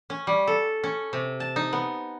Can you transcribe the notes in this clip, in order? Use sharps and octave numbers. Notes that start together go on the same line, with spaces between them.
C#4
G3
A4
C#4
C3
A5
D#4
B3